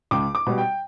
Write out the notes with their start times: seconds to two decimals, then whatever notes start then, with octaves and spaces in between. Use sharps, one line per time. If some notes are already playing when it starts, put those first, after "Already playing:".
0.11 C#2 D6
0.35 D6
0.47 B2 G3
0.58 G5